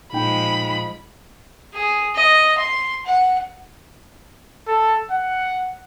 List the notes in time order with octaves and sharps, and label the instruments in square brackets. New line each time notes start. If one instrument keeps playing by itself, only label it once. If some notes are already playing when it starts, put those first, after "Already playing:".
[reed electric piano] A#2 D#4 G5 [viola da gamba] F3 G#3 [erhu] B5
[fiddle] G#4
D#5
C6
F#5
[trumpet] A4
F#5